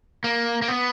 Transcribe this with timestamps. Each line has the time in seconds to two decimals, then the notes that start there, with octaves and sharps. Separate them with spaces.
0.24 A#3
0.62 A#3
0.68 B3